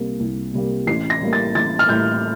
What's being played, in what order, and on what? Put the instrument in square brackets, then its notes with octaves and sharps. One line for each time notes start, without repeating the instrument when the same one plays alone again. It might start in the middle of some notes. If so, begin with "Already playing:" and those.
Already playing: [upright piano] C2 C3 G3 A#3
C2
C3 G3 A#3
A1 C7
A#6
A2 G3 A#3
A6
A1 A6
F6
A2 G3 A#3 G6